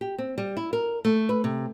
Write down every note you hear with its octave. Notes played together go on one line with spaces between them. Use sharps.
G4
C4
G3
E4
A#4
A3
B4
C3